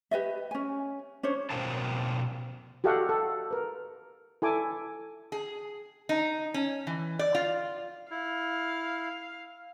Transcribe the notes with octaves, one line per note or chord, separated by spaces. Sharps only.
G4 B4 D#5 E5
C#4 G#5
C#4 D4 C5 C#5
B2 A#4 C5 F5 G5 A5
F#4 G4 A4 D#5 F5 F#5
A4
A#4 B4
E4 A4 G#5 D6
G#4
D#4
C#4
E3
D5
F4
E4 F5